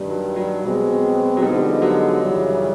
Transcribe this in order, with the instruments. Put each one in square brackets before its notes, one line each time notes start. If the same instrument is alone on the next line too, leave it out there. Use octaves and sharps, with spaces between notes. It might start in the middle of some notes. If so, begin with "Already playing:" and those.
Already playing: [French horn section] G2 D#3 G3
[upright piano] F#3
F#3
[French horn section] B2 G#3 C4
[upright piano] F#3
[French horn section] D3 F3 G#3 B3 D#4 [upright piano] G3
[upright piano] F#3
[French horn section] F#2 C#3 E3 G3